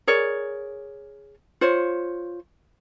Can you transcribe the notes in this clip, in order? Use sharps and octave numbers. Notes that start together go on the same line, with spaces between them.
G#4 A#4 C#5 D5
F4 C5 C#5